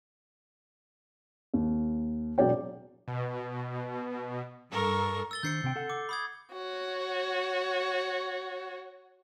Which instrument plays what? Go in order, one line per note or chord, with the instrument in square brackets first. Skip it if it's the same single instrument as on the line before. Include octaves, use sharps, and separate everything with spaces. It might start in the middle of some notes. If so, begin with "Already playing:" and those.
[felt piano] D#2
E1 B2 F#3 D5 G5
[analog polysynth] B2
[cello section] G2 A4 [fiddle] A#4 C#6
[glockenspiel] E6 A6 G7
[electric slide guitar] D#3 D4 C5 [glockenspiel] G6 C7 C#7
[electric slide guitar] C3 C4 G5
A4 F#5
[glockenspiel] D6
B5 D#6 G#6
[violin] F#4 C#5